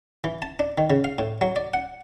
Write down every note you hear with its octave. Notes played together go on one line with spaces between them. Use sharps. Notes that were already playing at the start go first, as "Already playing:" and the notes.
E3
A5
D4
D#3
C#3
F5
A2
F#3
D5
F#5